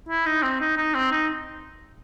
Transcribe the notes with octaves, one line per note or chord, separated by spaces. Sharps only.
E4
D#4
C4
D#4
D#4
C4
D#4